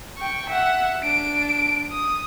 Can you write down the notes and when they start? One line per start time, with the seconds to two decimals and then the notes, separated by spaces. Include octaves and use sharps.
0.18 G5 C#6
0.50 E5 F#5
1.02 D4 D7
1.91 D#6